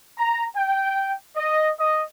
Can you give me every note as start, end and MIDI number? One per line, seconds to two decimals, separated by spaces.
0.18 0.44 82
0.55 1.13 79
1.36 1.68 75
1.78 2.01 75